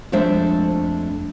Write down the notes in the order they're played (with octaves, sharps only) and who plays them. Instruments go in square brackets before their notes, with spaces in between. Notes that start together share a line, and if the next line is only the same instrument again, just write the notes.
[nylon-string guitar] F2 G#3 A3 D4 C5 E5